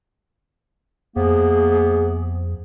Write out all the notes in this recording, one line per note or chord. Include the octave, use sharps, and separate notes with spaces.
F2 C3 A#3 B3 G#4